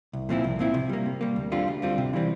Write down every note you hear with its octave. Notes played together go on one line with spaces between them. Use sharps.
C2
A#2 F3 C4 E4
C2
A#2 F3 C4 E4
C3
G3 A#3
C3
G3 A#3
D2
D3 G3 C4 F4
D2
D3 G3 C4 F4
C3
E3 G3 C4